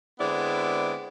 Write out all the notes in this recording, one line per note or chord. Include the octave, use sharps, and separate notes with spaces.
D3 G#3 B3 C4 E4 D5